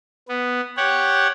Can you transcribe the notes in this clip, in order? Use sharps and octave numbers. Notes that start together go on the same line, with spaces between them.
B3
G4 C#5 F#5